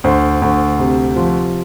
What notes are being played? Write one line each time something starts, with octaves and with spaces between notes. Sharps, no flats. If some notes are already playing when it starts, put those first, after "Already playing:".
D2 C5
D2
C3
F3